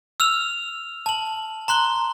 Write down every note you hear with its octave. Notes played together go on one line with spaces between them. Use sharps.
E6 F6 F7
A5 F#7
A#5 C6 F#6 G7